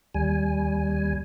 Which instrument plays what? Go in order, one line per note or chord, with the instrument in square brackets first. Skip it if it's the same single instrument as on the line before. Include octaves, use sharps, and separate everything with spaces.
[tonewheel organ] D#2 G3 G#5